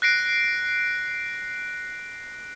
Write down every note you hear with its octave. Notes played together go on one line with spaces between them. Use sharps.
F#6 A#6 C7 D7